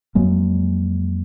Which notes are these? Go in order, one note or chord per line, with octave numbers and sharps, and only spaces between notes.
F2 F#3 G#3 A#3